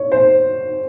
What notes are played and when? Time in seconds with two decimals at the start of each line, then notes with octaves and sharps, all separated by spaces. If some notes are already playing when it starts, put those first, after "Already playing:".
Already playing: C#5
0.12 C5